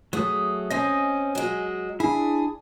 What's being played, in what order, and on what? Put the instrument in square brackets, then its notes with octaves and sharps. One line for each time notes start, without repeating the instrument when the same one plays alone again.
[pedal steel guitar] F#3 G#4 D#6 [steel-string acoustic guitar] A3
[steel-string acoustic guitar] C4 C#4 [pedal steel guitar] D#5 G#5 D#6
[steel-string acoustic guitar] F#3 G#3
[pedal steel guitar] D4 E4 [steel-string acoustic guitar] G#4